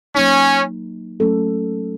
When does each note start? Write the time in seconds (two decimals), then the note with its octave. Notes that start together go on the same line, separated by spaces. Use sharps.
0.15 F#3 A#3 C#4 D#4
1.20 F#3 A3 C#4 A4